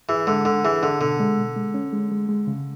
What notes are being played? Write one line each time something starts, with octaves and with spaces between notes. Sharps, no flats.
E3 G#4
D3 G#3
D3 D4
E3 G#4
D3 D4
B2 D3
G#3
B2
G#3
C#4
G#3
G#3
G#3
C#3